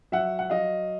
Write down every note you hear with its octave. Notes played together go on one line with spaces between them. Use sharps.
F#3 E5 F#5
F#5
F#3 D#5 F5